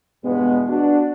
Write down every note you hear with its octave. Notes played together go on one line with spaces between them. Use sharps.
E2 G2 B2 G#3 B3
D4 F#4